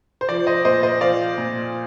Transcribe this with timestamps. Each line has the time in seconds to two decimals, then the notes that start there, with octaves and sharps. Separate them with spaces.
0.21 C5
0.29 F3 D5
0.47 C5 D#5
0.65 A#2 C5 D#5
0.83 C5 D#5
1.01 F3 D5 F5
1.38 A#2